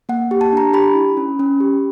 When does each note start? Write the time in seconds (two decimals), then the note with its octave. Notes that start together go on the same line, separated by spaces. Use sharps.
0.09 A#3 F#5
0.31 G4
0.41 A5
0.53 D4 A#5
0.73 G4 B5
0.95 E4
1.17 C#4
1.39 C#4
1.60 G4